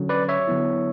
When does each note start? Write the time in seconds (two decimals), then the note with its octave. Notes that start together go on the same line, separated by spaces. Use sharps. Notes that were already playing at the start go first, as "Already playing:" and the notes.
Already playing: D3 F#3 C#4
0.09 B4 D5
0.29 C#5 E5
0.48 D3 F#3 B3 E4